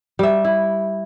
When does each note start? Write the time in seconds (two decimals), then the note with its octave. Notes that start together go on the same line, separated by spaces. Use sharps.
0.19 G3 E5
0.45 E4